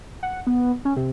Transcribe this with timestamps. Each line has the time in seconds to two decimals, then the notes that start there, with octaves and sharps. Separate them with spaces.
0.23 F#5
0.47 B3
0.85 C#4
0.97 C3